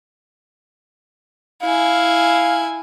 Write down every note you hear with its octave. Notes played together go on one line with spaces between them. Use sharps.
E4 F5 G#5